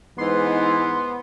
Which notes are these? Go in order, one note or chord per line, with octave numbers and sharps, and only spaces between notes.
G#2 E3 B3 C6